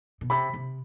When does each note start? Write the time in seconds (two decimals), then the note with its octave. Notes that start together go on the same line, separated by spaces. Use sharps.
0.21 B2
0.30 C3 B5
0.53 C3